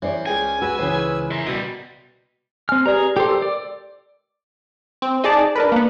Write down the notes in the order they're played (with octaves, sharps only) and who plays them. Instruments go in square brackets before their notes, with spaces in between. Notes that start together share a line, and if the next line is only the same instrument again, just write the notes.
[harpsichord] E3 [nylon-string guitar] C#4 C5 D5
[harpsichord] C#2 G#4 G5 [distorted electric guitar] G#5
[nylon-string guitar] F#4 [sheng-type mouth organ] B4 E6
[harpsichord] C#2 [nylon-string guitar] C#3 E3 C5
[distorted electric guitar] A#4 E5 [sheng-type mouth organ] C6
[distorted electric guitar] C2 G3 [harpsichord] B2 D#6
[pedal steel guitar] C4 F6 [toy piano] G#5
[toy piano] G4 B4 D5 [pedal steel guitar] G#4 A#5
[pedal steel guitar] G4 A4 C5 [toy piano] G5
[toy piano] A#4 E6
[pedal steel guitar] D5
[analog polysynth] C4
D#4 G#4 D5 A5
D4 A#4 B4
A#3 B3